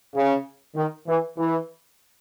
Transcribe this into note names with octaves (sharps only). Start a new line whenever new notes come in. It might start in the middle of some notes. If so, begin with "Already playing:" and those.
C#3
D#3
E3
E3